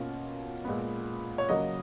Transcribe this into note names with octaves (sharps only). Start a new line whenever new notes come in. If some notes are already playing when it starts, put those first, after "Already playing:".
Already playing: B2 A#3 C#4 F4
A#2 G#3 B3
C#5
C#3 F#3 A#3 D#5